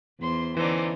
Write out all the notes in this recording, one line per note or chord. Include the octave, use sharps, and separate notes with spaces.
E2 C5 C6
D3 E3 C#4 D#4 C5 D5